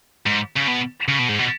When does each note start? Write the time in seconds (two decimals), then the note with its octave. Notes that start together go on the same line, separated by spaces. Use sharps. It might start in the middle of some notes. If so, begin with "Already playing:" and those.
0.26 G#2
0.56 C#3
0.68 B2
1.08 C#3
1.19 B2
1.29 G#2
1.39 B2